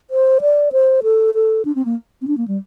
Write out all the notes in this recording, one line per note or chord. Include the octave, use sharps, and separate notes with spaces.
C5
D5
C5
A4
A4
D4
C4
A#3
C4
D4
A#3
G3